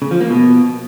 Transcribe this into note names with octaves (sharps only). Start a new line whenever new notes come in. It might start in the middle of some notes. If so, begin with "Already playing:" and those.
C#3
F3
A#3
B2